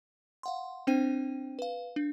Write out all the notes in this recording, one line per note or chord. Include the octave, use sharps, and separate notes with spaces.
F5 F#5 C6
C4 D4 C5 G5 D#7
B4 F5
D4